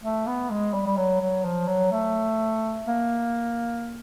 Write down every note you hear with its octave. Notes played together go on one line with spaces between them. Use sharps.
A3
B3
G#3
G3
G3
F#3
F#3
F3
F#3
A3
A#3